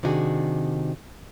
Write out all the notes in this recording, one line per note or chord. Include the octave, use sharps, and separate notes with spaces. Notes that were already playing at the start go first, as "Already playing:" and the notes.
C3 D#3 D4 E4 F#4 G#4